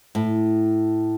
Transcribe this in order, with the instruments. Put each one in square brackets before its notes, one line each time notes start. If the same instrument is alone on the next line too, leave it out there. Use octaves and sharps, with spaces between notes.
[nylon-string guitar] A2